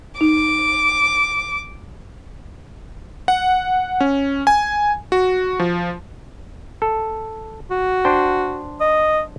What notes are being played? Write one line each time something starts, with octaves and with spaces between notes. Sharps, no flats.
D#4 D6
F#5
C#4
G#5
F#4
F3
A4
F#4
D4 C5 G5
D#5